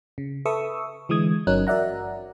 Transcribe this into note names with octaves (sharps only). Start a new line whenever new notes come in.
C#3
A4 B4 E5 C#6 D#6 E6
D3 E3 G#3 D#6 G#6
G1 F#3 C#4 D#4 A#4 F#6
F#4 A#4 D5 E5 F#5 A#5